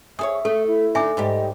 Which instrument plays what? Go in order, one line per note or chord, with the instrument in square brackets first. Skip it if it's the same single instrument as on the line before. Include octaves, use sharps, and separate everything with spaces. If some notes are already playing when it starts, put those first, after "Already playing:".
[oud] G#4 A4 C#5 [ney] E5 [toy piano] D#6
[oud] A3 [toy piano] A4
[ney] E4
[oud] D3 D#4 [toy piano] E5 G#5 D6
[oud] G#2 G3 G4 [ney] D#5